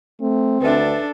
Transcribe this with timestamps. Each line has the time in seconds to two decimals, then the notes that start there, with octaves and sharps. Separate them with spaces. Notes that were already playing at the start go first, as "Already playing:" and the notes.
0.21 A3 C4
0.62 D2 D4 A4 B4 E5